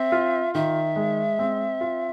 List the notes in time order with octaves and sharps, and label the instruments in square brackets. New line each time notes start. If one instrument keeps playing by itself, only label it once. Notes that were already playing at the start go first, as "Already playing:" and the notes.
Already playing: [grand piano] C4 [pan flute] E5
[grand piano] F4
[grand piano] D#3 [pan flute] E5
[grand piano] G#3
C4
F4